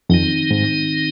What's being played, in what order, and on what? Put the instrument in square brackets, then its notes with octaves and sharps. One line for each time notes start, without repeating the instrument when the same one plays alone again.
[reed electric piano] F2 [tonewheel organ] D#3 C4 D#4
[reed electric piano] G#2